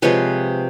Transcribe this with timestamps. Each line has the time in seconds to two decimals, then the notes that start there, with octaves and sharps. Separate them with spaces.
0.02 C3 F3 G#3 B4 C#5